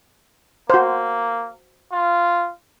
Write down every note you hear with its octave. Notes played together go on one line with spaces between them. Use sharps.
A#3 F#4 C5
F4